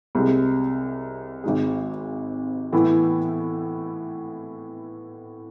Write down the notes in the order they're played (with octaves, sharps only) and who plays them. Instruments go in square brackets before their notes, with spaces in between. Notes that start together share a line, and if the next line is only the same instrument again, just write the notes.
[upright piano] C2 C3 G#3
G#1 G#2 G#3
A2 E3 B3 E4